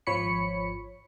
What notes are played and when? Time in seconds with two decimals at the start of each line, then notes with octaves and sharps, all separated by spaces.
0.07 G#1 F3 C#5 B5 C#7